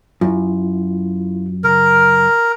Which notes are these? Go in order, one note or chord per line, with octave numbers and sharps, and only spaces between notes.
F#2 E4 F4
C#3 A#4